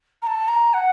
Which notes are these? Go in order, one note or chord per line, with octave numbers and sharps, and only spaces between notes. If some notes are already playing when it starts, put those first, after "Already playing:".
A#5
A5
A#5
F#5